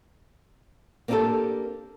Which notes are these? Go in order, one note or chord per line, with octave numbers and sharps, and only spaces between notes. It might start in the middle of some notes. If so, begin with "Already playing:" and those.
A#3 C4 D4 F4 G4 A4